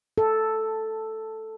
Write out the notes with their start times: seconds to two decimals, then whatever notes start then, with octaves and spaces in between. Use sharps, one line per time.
0.18 A4